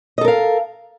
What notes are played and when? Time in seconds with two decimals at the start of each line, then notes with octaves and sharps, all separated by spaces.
0.18 D#5
0.21 A4
0.24 A#4
0.28 F5